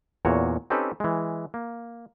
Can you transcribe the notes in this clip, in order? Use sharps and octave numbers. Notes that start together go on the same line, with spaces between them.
E2 A#2 F#4 C#5
C4 C#4 D#4 G4 A4 B4
E3 G#3
A#3